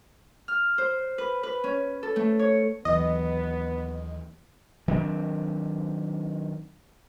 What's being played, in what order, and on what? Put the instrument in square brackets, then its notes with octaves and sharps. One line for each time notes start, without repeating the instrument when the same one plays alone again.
[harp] F6
C5
B4
B4
C#4
A4
A3
C#5
[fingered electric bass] D#2 F#3 [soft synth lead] E3 [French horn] B3 [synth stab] D#5
[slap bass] D#3 F#3 C4 D4